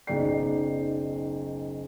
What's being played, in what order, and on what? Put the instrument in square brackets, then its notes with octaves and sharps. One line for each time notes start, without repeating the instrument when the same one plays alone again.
[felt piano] F#1 B1 D#4 D5 G5 C7